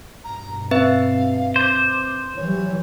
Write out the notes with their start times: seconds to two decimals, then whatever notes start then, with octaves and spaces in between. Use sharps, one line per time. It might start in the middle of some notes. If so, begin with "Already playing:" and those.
0.24 G2 B2 A#5
0.71 C4 B4 E5 F5
1.56 C5 D6
2.36 E3 F#3 G3 C#5